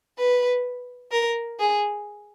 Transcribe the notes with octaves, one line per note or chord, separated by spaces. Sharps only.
B4
A#4
G#4